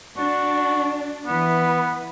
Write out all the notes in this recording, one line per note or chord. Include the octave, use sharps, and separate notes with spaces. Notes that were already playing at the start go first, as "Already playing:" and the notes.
D4 F#4
E3 B3 B4